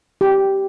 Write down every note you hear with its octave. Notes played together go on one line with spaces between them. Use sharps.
G4